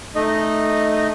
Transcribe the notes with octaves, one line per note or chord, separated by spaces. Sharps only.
A3 D#4 D#5